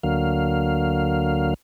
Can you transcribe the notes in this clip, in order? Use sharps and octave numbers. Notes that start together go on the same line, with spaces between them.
D2 D3 F#3 A#3 F5